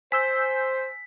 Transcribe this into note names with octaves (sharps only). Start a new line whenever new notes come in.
C5 G#5 E6 G6 B6